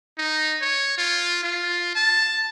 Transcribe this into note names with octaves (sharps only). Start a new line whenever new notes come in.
D#4
C#5
F4
F4
A5